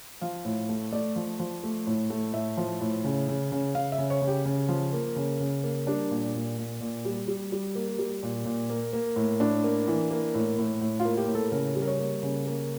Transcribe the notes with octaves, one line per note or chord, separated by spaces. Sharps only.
F3 F5
A2
A3
A3 D5
F3
F3
A3
A2
A3
A2 E5
F3
A2
C#3
C#3
C#3
C#3 F5
E5
C#3
C#5
C#3
G4
C#3
F3
A#3
C#3
C#3
A#3
G3 D4
A#2
A#2
A#2
A#2
G3
G3
G3
A#3
G3
A#2
A#2
A#3
A#3
A2
A2 D4
A#3
E3
A#3
A2
A2
A2
F4
A#3
G4
A2
A4
C#3 A#4
G3
A#4
C#5
A#3
C#3
A#3